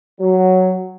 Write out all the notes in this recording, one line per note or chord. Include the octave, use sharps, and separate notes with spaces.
F#3